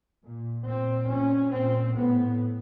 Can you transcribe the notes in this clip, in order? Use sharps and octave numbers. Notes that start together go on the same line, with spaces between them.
A#2
A#2 C4
A#2 C#4
A#2 C4
A2 B3